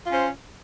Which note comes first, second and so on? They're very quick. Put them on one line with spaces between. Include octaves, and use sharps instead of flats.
F4 C#4 C5